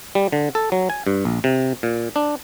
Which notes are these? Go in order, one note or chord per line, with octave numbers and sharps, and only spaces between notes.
G3
D3
A4
F#3
G#5
G2
A#1
C3
A#2
D4